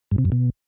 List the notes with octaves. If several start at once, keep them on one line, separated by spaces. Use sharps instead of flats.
G2
C3
F#2
B2